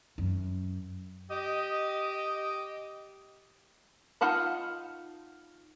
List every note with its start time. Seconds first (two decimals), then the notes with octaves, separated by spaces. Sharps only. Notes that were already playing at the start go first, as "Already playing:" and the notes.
0.18 F#2
1.31 G4 D#5
4.21 D#4 F4 F#5 A5 B5